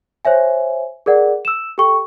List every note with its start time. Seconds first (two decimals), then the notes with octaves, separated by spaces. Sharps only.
0.25 C5 C#5 E5 G#5
1.06 G#4 A#4 D5 F#5
1.45 E6 E7
1.78 G4 A4 G5 C#6